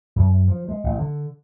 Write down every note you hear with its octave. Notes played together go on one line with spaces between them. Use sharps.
F#2
F3
G#3
A1
D3